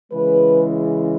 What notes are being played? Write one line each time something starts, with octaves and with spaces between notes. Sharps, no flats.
C#3 E3 G#3 B4